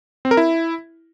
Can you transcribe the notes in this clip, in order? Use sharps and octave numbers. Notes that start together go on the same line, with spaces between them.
C4
A#4
E4